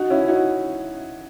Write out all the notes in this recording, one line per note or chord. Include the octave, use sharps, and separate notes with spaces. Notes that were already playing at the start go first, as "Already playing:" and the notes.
Already playing: D#4 F#4
C#4 E4
D#4 F#4